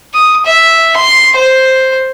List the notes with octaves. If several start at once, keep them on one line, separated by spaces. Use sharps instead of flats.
D#6
E5
C6
C5